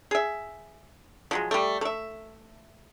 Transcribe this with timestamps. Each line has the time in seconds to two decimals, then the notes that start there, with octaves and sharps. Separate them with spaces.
0.11 G#4 E5
1.31 F3 F#3 G#3
1.51 G3 A3
1.81 A3 E5